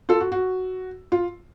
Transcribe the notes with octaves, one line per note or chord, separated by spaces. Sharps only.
F4 A4
F#4
F#4
F4